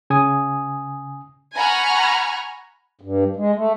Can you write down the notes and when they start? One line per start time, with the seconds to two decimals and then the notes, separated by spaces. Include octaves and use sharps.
0.10 C#3 G#5 D#6
1.56 F#5 G#5 A#5 B5 C#6 F6
3.01 G2
3.36 G#3
3.55 A3